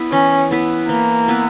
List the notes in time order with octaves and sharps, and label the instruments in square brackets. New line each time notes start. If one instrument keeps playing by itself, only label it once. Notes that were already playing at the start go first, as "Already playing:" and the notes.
Already playing: [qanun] B3 E4 B4
[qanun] E3 [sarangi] C#4
[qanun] B3 E4 B4
[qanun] E3 [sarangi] A#3
[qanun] B3 E4 B4